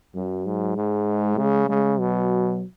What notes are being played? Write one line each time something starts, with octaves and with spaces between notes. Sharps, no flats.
F#2 F#3
G#2
G#2 G#3
C#3 G#3
C#3 G#3
B2 F#3